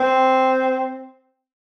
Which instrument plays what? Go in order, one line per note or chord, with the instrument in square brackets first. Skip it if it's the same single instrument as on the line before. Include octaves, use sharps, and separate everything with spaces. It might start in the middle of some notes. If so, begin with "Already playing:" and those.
Already playing: [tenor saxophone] C4